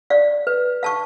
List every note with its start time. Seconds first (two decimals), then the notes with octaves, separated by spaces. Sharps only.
0.10 D5 F5
0.47 B4
0.83 F5 A5 C#6